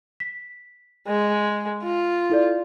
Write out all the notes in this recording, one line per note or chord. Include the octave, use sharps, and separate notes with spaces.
B6
G#3
F4
E4 A4 D5